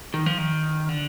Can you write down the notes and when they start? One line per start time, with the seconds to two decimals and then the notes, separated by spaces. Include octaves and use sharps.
0.14 D#3
0.26 F3
0.38 D#3
0.89 D3